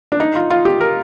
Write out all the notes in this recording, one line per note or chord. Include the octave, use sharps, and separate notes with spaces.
D4
D#4
F4
F4
G4
A#4